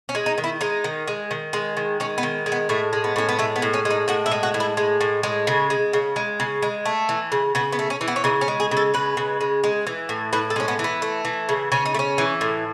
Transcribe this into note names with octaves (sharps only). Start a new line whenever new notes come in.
C#4
G#3
D#4
D#3
E4
G#3 D#4
D#3
G#3
D#3
G#3
D#3
G#3 C#4
B3
D#3
G#3
B3
A2 A3
G#3
B3
A2 C#4
B3
G#3 A3
B3
A2
C#4
G#3
D#4
A2 F#4
E4
G#3
F#4
A2
E4
G#3
A2
G#3
C#3
G#3
C#3
G#3
C#3
G#3
A3
E3
C#3
C#3 B3
B3
A3
C#4
E3
B3
C#4
C#3 D#4
C#4
G#3
G#4
C#3
A4
G#3 B4
C#3
G#3
G#3
E3
A2
A2 B4
A4
G#3 C#4
B3
E3
B3
A3
E3
C#3
C#3 C#4
D#4
A3
C#4
E3
A2